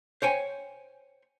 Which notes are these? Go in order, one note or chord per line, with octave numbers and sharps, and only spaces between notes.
C5 C#5 G5 G#5